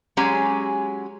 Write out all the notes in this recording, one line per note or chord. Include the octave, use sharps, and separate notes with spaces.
F#3 G#3 C#4 G4 G#5 A#5